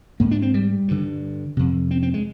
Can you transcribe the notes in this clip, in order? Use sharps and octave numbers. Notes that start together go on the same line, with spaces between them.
G#2 A#3
D4
C4
G3
G2 D3
F2 C3
C4
C4
G#3